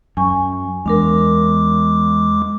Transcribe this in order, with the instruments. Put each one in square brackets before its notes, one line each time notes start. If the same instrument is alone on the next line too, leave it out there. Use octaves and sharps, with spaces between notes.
[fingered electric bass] F#2 [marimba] G#5 C#6
[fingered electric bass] E2 [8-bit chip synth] G#3 D6 [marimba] D4 A#4